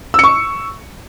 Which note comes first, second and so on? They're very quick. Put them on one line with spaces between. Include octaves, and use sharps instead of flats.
E6 C#7 C#6